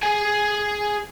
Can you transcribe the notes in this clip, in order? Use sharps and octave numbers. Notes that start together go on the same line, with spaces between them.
G#4 G#5